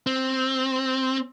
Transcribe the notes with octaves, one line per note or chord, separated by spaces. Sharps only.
C4